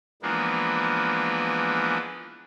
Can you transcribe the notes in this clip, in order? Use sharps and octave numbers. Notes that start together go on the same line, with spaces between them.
E3 F3 G#3 A#3 B3 D4